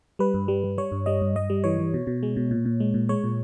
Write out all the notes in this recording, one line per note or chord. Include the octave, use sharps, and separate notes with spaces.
G3 B4
G2
G3
G3
G3 C#5
G2
G3 D#5
G2
G2 D#5
G3
E3 C#5
E3
B2
B2
G#3
B2
A#2
A#2
G#3
A#2
G#3 C#5
A#2